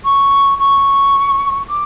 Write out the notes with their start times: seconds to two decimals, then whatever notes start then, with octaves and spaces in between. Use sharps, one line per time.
0.05 C#6
0.60 C#6
1.69 D6